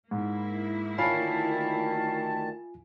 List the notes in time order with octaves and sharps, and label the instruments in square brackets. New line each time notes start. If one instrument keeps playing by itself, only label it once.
[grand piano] G#2 [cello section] A#3 E4
[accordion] D2 D#3 A5 [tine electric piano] F4 G#5 [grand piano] C#5 F5 B5